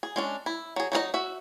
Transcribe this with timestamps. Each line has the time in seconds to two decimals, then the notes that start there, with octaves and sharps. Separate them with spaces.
0.03 G#4
0.16 G#3 C#4 D4
0.46 E4
0.76 F#3 G#4
0.92 F#3 D#4 G#4 D#5
1.14 F#4 E5